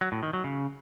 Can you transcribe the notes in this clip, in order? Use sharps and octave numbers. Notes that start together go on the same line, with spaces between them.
F#3
A2
D#3
F#3
C#3